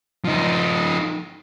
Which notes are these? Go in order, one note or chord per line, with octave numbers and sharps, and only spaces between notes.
F3 D#4